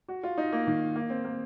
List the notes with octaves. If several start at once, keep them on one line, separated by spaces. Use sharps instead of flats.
F#4
F4
D#4
A#3
D#3
A#3
C4
A#3